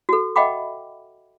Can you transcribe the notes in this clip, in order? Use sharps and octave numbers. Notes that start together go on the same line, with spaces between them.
F#4 A4
D#5 E5 F#5 G5 B5 D6